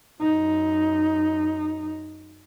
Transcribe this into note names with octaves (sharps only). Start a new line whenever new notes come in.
F#2 D#4